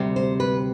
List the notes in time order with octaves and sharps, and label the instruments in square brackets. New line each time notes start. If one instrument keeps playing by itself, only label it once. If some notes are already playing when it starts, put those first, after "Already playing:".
Already playing: [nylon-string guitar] D2 C3 G3
C5
B4